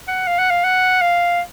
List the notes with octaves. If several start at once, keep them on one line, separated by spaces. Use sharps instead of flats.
F#5
F5
F#5
F5
F#5
F5